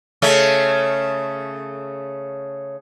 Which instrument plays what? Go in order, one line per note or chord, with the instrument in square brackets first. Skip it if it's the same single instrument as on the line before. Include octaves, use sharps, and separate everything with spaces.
[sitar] C#3 A3 C#4